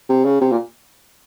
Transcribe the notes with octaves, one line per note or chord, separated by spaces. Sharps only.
C3
C#3
C3
A#2